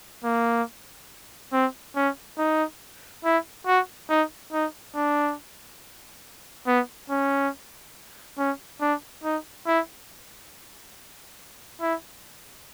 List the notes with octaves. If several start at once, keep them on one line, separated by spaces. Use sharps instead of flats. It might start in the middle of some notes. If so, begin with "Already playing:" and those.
A#3
C4
C#4
D#4
E4
F#4
D#4
D#4
D4
B3
C#4
C#4
D4
D#4
E4
E4